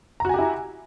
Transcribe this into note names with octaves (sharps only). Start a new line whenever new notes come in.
E4 F#4 G4 G#5 A#5